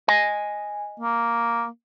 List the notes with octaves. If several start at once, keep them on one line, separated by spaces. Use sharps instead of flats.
D#5 G#5
A#3